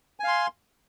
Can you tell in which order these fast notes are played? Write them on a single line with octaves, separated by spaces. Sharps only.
G#5 F5 C6